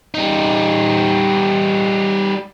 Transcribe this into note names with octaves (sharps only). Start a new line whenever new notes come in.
G3 D#4